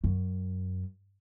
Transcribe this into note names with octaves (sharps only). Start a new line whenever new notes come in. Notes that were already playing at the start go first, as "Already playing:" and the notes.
F#2